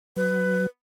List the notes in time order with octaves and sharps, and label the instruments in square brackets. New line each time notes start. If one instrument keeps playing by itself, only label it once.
[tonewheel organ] F#3 [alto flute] B4